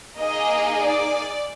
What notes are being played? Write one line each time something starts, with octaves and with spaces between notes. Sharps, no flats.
A#3 D#4 G#4 D#5
D5